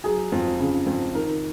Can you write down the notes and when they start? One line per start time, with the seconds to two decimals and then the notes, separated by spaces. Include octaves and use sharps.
0.04 F#3 G#4
0.32 F2
0.60 C#3
0.86 F2
1.14 D#3 A#4